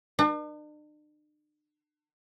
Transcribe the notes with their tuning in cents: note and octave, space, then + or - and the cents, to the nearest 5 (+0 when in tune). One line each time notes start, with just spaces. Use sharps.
D4 +45